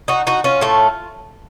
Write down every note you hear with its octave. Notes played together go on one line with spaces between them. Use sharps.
D#4 F#4
D#4 F#4
C#4 F4
A2 A3